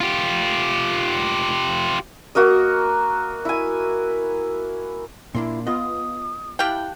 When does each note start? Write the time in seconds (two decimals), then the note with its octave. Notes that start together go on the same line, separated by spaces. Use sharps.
0.01 F4 G4
2.35 A#3 F#4 A#4 D#5
3.45 E4 G#5
5.35 A#2 A#3 D4 E4 C6
5.67 B3 F4 D#5 D#6
6.59 E4 G4 F5 G5 A5 F#6 G6